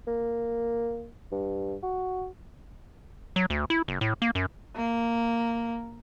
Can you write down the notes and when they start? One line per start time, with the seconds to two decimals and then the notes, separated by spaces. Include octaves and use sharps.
0.07 A#3
1.32 G2
1.83 F#4
3.36 F#3
3.50 D2
3.70 E4
3.88 F#1
4.01 A2
4.22 A#3
4.35 F#2
4.76 A#3